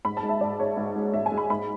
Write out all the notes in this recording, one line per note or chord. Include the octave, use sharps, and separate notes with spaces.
G#2 B5
A5
G#3
E5
G#2 D5
G#3 C#5
G#2
G#3
G#2 E5
G#5
G#3
B5
G#2 B5